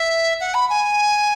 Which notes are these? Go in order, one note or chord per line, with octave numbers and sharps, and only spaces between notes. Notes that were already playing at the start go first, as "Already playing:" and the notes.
Already playing: E5
F#5
B5
G#5